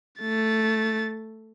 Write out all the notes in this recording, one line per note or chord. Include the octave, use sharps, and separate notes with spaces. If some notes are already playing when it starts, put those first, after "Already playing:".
A3 A6